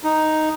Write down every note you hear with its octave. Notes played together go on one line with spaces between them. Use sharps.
D#4